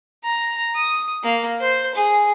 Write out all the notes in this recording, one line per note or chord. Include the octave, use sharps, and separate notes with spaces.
A#5
D#6
A#3
C5
G#4